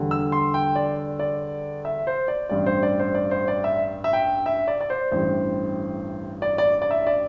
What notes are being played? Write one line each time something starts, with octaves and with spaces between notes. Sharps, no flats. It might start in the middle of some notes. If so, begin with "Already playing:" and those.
Already playing: E2 D3 G3
E6
C6
G5
D5
D5
E5
C5
D5
A1 G2 G3 D5
C5
D5
C5
D5
C5
D5
E5
E5
G5
E5
D5
D5
C5
A1 G2 E3 G3 C5
D5
D5
D5
E5
D5